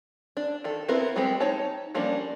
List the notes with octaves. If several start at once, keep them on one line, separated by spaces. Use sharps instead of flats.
D4
D#3 A4
B3 C4 E4 A#4 B4
G3 G#3 B3 C4 G4
D#4 C#5 A5
F3 G3 A#3 C#4 D4